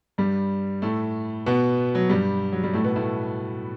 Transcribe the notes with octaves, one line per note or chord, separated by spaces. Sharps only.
G2 G3
A2 A3
B2 B3
F#3
G2 G3
F#3
G3
A2 A3
B2 B3
A2 A3